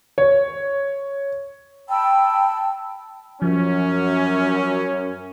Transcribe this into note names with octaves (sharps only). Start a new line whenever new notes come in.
C#5
G5 A5 B5 E6
F#2 F3 C#4